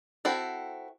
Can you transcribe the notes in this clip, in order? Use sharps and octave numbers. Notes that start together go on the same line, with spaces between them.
C4 E4 F#4 A4